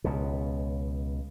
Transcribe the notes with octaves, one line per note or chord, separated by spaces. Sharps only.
C#2 B2